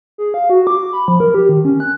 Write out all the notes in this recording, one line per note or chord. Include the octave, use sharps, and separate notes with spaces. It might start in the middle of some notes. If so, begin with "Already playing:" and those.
G#4
F5
F#4
D6
B5
F3
A#4
G4
D#3
C#4
F#6